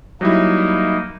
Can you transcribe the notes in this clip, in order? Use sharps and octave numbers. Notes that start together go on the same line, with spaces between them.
F#3 G3 A#3 D#4 E4